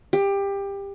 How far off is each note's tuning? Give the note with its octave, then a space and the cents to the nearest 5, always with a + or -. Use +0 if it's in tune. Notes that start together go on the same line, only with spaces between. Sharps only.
G4 +20